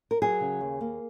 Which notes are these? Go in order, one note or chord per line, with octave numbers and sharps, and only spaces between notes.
A#4
F#3 G#4
C#3
D#2
A#3